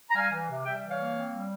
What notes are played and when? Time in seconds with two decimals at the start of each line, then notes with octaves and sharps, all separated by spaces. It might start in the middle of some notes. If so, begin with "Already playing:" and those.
0.09 A#5
0.15 G3 F5 G#5
0.32 E3
0.49 C3
0.65 G3 E5 G5
0.82 E3
0.90 C#5 F5
0.99 A#3
1.15 C4
1.32 G3